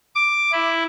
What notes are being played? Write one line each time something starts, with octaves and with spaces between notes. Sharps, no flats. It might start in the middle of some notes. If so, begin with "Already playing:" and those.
D6
E4